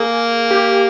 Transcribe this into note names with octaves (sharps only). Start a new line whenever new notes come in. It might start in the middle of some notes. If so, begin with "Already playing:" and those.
Already playing: A#3 G#4
G4